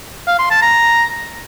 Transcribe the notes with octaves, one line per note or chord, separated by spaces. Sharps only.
F5
C6
A5
A#5